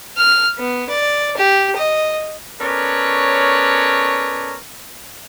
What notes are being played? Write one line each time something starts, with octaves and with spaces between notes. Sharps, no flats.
F6
B3
D5
G4
D#5
B3 C#4 A4 A#4 C#5 D5